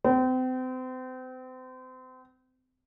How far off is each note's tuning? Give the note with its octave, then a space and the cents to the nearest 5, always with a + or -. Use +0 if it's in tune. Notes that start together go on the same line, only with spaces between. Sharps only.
C4 -35